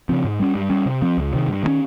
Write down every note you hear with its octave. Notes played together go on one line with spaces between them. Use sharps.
C#3 F3 C4
G#2
G3 C#4
G2
G3 C#4
C3
F3 C4
C#2
C3 D#3
G2
D#3 G#3 C#4